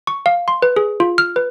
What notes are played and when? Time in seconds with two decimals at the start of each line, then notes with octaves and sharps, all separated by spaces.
0.07 C#6
0.26 F5
0.48 C6
0.62 B4
0.76 G#4
1.00 F4
1.18 F6
1.36 B4